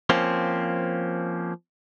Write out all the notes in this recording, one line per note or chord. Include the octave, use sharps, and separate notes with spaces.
F3 A#3 C4 C#4